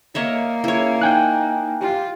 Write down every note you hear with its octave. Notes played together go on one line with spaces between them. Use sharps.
A#3 C#5 D#5 E5
C#3 E4 C#5
D#4 G5 G#5 F#6
F4 G4